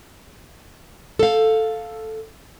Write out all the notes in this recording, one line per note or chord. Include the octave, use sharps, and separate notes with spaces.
A4 F5